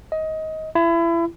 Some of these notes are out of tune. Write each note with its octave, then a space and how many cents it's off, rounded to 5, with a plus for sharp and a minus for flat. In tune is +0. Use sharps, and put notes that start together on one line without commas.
D#5 +20
E4 +30